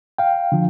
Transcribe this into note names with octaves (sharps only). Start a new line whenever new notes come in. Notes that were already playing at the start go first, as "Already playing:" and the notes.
F5 G5
D3 F3